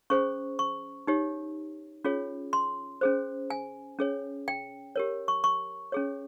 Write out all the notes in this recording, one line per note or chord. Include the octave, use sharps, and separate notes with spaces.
C#4 G#4 C5 C#6
C#6
D#4 G4 C#5
C#4 F4 G#4 C#5
C6
C#4 G#4 C5
G#5
C#4 G#4 C#5
G5
G4 A#4 C#5
C#6
C#6
C#4 G#4 C#5